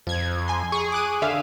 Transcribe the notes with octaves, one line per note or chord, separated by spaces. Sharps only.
F2 F3 G#6
G#5 C6
G#4 C#6
D6 F#6 D#7
D3 E5 F5